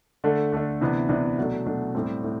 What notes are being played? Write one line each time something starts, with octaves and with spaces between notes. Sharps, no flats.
D3 A3 D4
D3 A3 D4
C3 E3 B3 D4
C3 E3 B3 D4
B2 F#3 A3 D4
B2 F#3 A3 D4
A2 G3 C4
A2